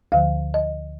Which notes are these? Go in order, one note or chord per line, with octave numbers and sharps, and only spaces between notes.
D2 D3 F3 F5
D#5